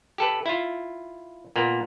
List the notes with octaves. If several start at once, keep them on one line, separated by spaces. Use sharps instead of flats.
G4 A4 B4
E4 F4
A#2 A#3 B3